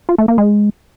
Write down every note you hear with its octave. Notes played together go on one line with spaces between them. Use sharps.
F4
A3
A#3
G#3